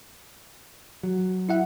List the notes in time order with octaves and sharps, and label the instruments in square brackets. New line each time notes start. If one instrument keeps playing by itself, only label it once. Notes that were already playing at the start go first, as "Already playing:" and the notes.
[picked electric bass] F#3
[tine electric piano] E4 E5 F#5